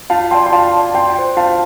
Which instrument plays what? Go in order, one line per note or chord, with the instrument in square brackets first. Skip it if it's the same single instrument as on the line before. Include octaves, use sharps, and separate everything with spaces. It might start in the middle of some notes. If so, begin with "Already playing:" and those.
[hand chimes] F4 [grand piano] F5 A5
[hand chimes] D5 A5 [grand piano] G5 C6
[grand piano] C6
[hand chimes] F4 [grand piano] F5 A5
[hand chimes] D5 A5
[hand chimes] F4 [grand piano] G5 C6
[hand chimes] C5 G5
[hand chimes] F4 [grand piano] F5 A5